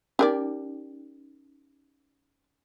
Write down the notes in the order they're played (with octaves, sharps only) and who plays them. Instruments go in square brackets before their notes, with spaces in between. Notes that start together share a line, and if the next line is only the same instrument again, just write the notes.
[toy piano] C#4 D#4 [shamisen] G4 A#4 D5